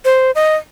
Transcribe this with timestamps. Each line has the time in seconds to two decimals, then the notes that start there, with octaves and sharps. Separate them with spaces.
0.05 C5
0.35 D#5